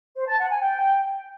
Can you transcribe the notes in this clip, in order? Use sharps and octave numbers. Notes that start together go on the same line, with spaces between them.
C5
A5
F#5
G#5
G5